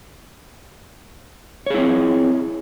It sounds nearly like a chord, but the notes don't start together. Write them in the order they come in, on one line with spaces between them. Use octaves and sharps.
C#5 G#4 E4 C4